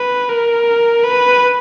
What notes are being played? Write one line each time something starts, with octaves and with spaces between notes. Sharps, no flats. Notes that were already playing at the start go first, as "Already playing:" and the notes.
Already playing: B4
A#4
B4